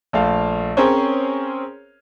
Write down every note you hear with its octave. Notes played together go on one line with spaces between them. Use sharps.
A#1 A3 F5
C4 C#4 G#4 A#4 C5 C#5